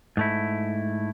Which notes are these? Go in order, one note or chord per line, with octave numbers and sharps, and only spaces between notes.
G#2 A3 E4